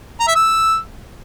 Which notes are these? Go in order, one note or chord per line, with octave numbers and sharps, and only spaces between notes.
A#5
E5
E6